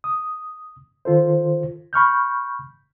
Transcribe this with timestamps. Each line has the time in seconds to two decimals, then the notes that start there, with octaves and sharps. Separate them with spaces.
0.04 D#6
1.05 D#3 F4 A4 C5
1.93 B5 C#6 F6 G6